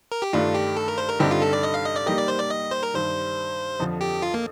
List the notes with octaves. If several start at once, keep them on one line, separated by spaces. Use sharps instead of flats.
A#4
G4
G2 D#3 A3 D4 F4
G4
A4
A#4
C5
A#4
G2 D3 G3 C4 D#4 G4
F4
A4
D5
D#5
F5
D#5
D5
G3 A#3 D#4 G4 A#4 D#5
D5
C5
D5
D#5
C5
A#4
G2 D#3 G3 C5
F2 D3 F3
G4
F4
A#3